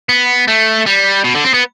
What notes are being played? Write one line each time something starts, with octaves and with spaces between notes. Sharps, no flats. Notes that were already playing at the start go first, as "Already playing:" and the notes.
B3
A3
G3
B2
D3
C4
B3